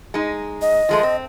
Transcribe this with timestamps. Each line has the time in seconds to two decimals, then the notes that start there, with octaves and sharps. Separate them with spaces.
0.14 G#3 D#4
0.62 D#5
0.89 F3 G#3 A3
1.03 C4